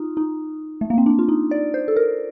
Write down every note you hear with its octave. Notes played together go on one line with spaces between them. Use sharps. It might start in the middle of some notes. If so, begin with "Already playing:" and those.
Already playing: D#4 F4
D#4
A3
A#3
C4
D4
F4
D#4
D5
C5
A4
A#4